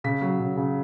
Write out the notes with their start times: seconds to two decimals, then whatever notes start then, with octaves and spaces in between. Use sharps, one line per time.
0.04 C#3 B6
0.21 F#3
0.40 C#3
0.57 C#3